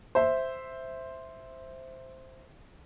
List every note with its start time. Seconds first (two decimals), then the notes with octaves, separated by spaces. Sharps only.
0.15 C5 E5